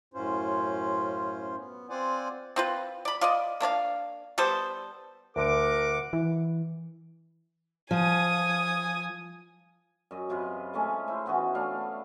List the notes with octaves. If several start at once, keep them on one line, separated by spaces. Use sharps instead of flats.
F#2 A2 C#4 F4 C5
B3
C4 F4 C5 D5 F#5 G#5
C4 F4 B4
D5 B5
F4 D5 D#5
A#3 D4 C#5 F5
G3 B3 A4 C5
D2 D3 A#4 F#5 D6
E3
F3 G#5 D#6
F#2 D#5
F#2 C3 F4 B4
G#3 A3 C#4 G#4
E4 C5
E3 B3 C#4 F#4
A3 C#4 D4 F5